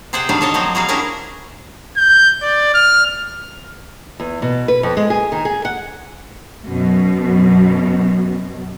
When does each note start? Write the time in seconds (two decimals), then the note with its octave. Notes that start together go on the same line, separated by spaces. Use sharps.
0.13 C3 G#4 C5 D5 F#5 G5
0.29 B2 D3 D#3 G3 D4 F5
0.41 A4 C#5 D#5 A5
0.54 F3 F#3 A#3 C4
0.75 G3 A#3 F#4 G#4 D5 F5
0.88 C#4 D4 E4 F#4 G#4 A#4
1.97 G6
2.42 D5
2.74 F6
4.20 E2
4.42 B2
4.68 B4
4.83 F2
4.97 G#3
5.10 G#4
5.32 D#3
5.45 G#4
5.65 F#5
6.66 F#2 B2